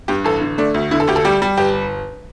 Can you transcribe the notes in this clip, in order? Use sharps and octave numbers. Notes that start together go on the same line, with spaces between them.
G2 G4
A1 A4
D3
A3 D4
D2
D3 E4
A4
D2 G4
A4
G3 G4
G3
G1 G4